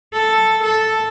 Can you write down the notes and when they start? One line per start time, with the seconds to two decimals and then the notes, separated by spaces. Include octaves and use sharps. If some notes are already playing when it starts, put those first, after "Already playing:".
0.13 A4
0.63 A4